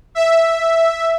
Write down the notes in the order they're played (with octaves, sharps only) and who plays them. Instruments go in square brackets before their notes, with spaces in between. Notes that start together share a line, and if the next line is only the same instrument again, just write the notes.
[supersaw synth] E5